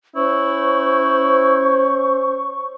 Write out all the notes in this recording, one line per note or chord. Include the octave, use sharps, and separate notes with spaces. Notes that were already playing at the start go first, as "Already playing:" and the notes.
C#4 E4 C5 C#6